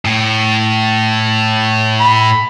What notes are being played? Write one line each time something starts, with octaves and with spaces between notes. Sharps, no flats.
A2
B5